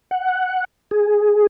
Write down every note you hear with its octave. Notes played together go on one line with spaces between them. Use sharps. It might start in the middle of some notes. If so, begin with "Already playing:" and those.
F#5
G#4